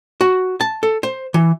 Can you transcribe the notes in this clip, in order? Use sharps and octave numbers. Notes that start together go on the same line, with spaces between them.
F#4
A5
A4
C5
E3